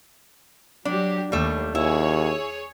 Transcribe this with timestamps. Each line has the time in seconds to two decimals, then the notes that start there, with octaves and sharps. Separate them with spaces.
0.85 F#3 D4 G4
1.32 D#2 G3 A3
1.75 D#2 E4 G#4 C#5